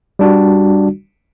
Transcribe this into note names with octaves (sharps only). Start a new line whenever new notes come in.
G3 D4 F#4